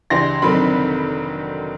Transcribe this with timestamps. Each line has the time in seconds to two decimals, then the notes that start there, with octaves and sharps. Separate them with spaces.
0.10 C#2 E3 D4 G4 C6 A#6
0.42 F1 D3 D#3 F#3 C4 B5